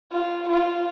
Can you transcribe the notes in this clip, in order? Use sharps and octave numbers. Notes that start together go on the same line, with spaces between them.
F4
F4